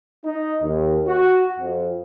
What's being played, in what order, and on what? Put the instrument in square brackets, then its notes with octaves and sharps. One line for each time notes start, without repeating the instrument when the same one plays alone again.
[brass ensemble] D#4
D#2
F#4
F2